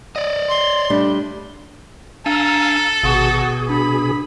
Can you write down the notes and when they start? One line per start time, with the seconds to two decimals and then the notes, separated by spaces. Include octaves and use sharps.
0.16 D5 D#5
0.49 C6
0.90 G3 A3 D4
2.26 D4 A4 F5 G#5 A#5 E6
3.03 G#1 B2 F#4 G#4
3.69 D4 B5